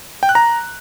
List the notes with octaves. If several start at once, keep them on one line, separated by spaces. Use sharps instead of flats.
G5
F#6
A#5